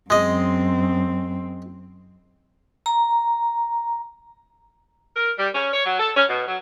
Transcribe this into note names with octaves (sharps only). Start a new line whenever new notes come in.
F#2 G#3 C4 D#5
A#5
A#4
G3
C#4
C#5
F#3
A4
C#4
B2
F#3